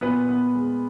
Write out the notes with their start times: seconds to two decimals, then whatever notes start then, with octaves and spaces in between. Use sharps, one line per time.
0.01 A#2 B3 B4
0.29 B3
0.55 G#3